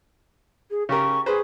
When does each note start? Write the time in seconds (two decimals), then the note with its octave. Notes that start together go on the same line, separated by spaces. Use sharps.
0.70 G#4
0.89 C#3 G4 A#4 C#6
1.26 G#4 B4 C5